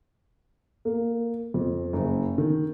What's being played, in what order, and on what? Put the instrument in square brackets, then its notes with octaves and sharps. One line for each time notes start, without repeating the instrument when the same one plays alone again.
[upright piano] A#3
F2
F#1
D#3